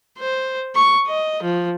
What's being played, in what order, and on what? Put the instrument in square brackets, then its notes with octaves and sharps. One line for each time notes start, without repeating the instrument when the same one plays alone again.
[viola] C5
C#6
D#5
F3